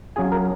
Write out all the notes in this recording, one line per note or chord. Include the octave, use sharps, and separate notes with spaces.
F#3 C#4 F4 G#4 G#5
A#4 A#5